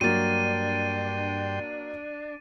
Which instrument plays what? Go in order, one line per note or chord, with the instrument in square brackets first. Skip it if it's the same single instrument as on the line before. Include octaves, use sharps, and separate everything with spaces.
[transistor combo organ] G2 G5 C6 [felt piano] F#3 A#3 [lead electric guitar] D4 [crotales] A6 D#7